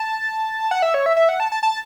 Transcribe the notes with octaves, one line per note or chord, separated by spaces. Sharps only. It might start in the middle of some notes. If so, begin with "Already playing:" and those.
Already playing: A5
F#5
E5
C#5
E5
E5
F#5
A5
A5
A5